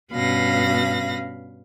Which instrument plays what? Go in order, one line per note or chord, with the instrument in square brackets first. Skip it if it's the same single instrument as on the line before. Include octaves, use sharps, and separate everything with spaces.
[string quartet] G2 B2 C#4 F5 B5 A#6